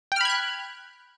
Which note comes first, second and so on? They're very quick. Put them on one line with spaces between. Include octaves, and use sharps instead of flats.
G5 F6 B5 G#6 F#6